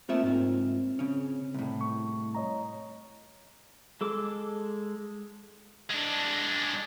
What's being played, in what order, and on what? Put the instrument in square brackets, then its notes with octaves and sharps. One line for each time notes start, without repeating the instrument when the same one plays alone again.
[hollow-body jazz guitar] A3 F4 E5 [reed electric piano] A#3 C4
[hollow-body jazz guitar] G#2 F4
C#3 C#4
C2 A2
[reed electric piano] C#6
C#5 D#5 A#5
[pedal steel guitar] G#3 A4 D6
[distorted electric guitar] G#3 D4